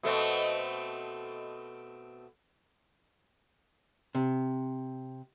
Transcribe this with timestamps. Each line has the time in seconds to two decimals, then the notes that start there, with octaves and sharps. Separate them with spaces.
0.03 B2 A3 C4
4.15 C3